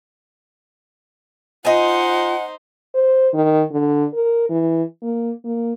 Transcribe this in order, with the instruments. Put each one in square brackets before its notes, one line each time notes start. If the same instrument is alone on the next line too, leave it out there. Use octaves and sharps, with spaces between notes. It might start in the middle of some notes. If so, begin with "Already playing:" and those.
[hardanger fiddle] D#4 C5 [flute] F4 [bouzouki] D#5 G#5 [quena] F#5
[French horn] C5
D#3
D3
A#4
E3
A#3
A#3